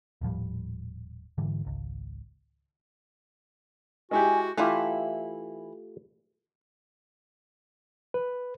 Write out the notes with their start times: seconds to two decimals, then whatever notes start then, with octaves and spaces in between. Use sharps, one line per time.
0.21 D#1 A2 F3 G3
1.38 G#2 D3 E3 G3
1.65 G#1 C#2
4.11 G#3 E4 F#4 G4 G#5
4.57 E3 A3 E4 F4 G4
8.14 B4